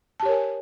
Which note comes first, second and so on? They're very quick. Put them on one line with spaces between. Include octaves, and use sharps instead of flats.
A5 G4 C#5 A#4 G#5